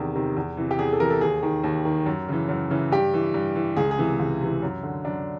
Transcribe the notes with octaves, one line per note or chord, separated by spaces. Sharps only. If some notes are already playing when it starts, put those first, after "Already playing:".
Already playing: E2 C3 D#3
C3 D#3
E2
C3 E3
G4
E2 G#4
A4
C3 E3 A#4
A4
D#2 G#4
D#3
D#2
D#3
F#2
C#3 E3
F#2
C#3 E3
G2 G4
E3
G2
E3
C#2 G#4
G#4
C3 E3
C#2
C3 E3
F#2
D3
F#2 D4